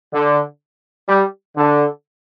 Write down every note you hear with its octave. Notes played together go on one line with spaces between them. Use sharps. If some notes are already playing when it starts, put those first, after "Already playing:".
D3
G3
D3